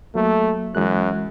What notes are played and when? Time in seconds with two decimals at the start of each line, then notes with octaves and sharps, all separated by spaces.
0.15 F#3 A3 A#3
0.75 F#2 E3 G#3 F#6